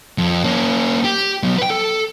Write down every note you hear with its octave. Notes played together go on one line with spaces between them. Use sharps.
F2
A#3 C#4
G4
F#3 B3
B4 G5
A4